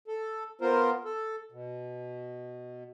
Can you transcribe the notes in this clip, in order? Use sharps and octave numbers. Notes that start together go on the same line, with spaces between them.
A4
B3 F4 A#4 C5
A4
B2